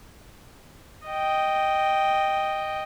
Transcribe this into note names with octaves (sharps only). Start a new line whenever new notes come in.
D#5 G5